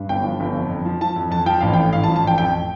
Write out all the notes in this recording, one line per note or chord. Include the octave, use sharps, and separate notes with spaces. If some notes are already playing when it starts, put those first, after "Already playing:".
Already playing: G2
G1 G5
F3
G1
F2
F2
F3
F3 A5
F2
F2 A5
F3 G5
A1 F5
A2 G5
A1 F5
A5
F3
A5
A1 G5
F2 G5